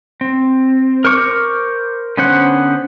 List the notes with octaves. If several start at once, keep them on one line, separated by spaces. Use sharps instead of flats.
C4
A#4 C5 C#6 D6 F6
D3 B3 C#4 C5 F#5